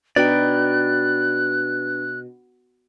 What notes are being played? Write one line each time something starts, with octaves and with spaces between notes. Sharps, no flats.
B2 D4 D#4 B4 D5 G5 B5 F#6